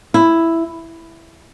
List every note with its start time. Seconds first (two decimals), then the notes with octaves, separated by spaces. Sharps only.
0.14 E4